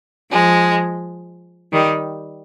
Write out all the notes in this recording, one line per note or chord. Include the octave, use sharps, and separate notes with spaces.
F3 G#3
D#3 G3